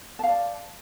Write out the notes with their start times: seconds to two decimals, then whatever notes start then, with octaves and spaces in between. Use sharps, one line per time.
0.19 A5
0.23 F5
0.28 D5